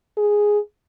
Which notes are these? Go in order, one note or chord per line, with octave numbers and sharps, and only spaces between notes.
G#4